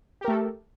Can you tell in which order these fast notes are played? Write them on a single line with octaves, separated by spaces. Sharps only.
G4 A#4 A3 A4